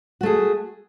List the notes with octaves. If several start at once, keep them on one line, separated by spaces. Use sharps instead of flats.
A3 F#4 G#4